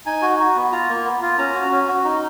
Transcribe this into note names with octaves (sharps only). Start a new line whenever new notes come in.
D#4 G#5
F#4
F#4
B3
F4 A#5
A#3
B3
F4
C#4 A#5
F#4
C#4
F#4
D#4